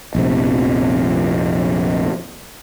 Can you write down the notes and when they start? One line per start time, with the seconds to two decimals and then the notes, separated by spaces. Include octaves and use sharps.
0.15 A#1 F2 C3